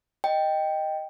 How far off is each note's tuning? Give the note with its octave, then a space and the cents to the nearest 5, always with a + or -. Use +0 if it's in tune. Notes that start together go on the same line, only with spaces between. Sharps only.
D#5 +0 G5 +0